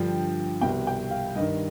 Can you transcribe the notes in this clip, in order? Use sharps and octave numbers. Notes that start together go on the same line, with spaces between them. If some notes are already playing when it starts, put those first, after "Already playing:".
Already playing: G2 D3 F3 G5
C2 B2 G5
G5
F5
G2 D#3 D#5